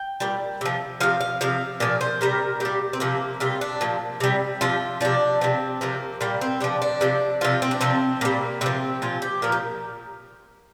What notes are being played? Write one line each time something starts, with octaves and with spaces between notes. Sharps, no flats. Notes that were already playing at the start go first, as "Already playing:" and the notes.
Already playing: G5
A#2 G3
C3 F3
C3 F3 F5
F5
C3 F3 F5
A#2 F3 D5
C5
C3 G3 A#4
A#2 G3 G4
C4
C3 F3 A#3
C3 G3 F4
D4
A#2 F3
C3 G3
C3 F3 F4
C3 F3 D4
C3 F3 C4
C3 F3 A#3
A#2 G3 A#3
C4
C3 F3 D4
D4
C3 F3
C3 F3 F4
C4
D4
C3 F3 C4
A#2 G3 A#3
C3 F3 C4
A#2 F3 F4
G4
A#2 F3 A#4
G4